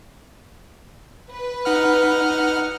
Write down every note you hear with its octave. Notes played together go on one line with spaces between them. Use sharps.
B4
D#4 F#5 F6